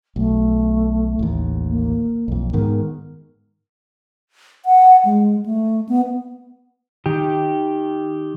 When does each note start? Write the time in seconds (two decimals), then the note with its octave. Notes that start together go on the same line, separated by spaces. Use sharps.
0.16 B1 A3
1.19 A1 D#2
1.69 A#3
2.28 B1 F2
2.53 G#2 D#3 B3 A#4
4.65 F#5
5.05 G#3
5.46 A3
5.89 B3
7.06 D#3 G4